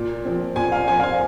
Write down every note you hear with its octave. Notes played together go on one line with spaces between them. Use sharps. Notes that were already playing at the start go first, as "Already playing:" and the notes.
Already playing: A#2
F3 C4
A#2 G#5
F5
F3 C4 G#5
F5
G#5